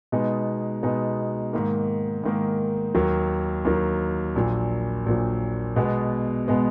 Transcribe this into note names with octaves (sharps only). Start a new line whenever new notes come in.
B2 G#3 B3 D#4
B2 G#3 B3 D#4
G#2 D#3 A#3
G#2 D#3 A#3
D#2 D#3 F#3
D#2 D#3 F#3
A#1 A#2 F#3
A#1 A#2 F#3
B2 G#3 B3
B2 G#3 B3